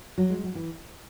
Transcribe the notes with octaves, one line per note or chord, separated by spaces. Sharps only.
F#3
G#3
F#3
E3